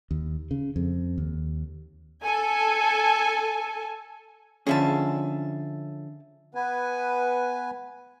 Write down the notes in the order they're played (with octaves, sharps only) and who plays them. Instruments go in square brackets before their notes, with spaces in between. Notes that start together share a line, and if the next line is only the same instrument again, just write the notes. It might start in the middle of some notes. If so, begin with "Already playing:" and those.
[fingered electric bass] D#2
C#3
F2
D#2
[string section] A4 G#5
[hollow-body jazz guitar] D3 F3 C#4 [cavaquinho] G#4 E5 A5
[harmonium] B3 B4 G#5